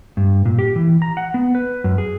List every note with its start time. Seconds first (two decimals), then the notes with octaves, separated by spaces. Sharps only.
0.17 G2
0.45 A#2
0.59 G4
0.76 E3
1.02 A#5
1.17 F#5
1.34 B3
1.55 B4
1.84 F#2
1.98 G#4